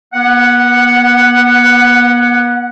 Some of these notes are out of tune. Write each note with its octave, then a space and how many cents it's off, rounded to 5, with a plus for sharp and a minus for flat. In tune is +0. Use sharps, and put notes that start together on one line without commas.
B3 -40 F#5 +0